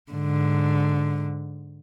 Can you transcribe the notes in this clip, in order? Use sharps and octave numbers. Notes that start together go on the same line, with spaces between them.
G#2 D3